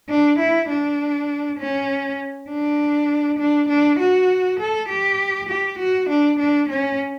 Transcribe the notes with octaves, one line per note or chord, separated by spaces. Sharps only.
D4
E4
D4
C#4
D4
D4
D4
F#4
A4
G4
G4
F#4
D4
D4
C#4